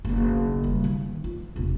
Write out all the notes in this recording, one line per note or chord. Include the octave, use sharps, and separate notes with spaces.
F#1 B1
G3
D#3
F4
E1 C3